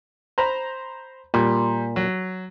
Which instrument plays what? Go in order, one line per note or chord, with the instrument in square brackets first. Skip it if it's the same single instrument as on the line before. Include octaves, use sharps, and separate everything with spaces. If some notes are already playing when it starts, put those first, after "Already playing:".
[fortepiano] C5 A#5 B5
[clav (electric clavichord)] A#2 [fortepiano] G3
[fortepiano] F#3